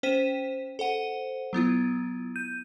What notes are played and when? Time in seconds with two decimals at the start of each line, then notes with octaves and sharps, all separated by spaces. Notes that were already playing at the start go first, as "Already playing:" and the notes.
0.03 C#4 C5 G5 B6 D#7 E7
0.79 A4 C5 F#5 D#7
1.53 F#3 B3 E4 F4
2.36 G6 D#7